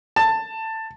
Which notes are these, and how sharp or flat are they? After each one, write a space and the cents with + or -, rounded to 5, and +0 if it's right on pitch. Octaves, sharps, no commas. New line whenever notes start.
A5 +15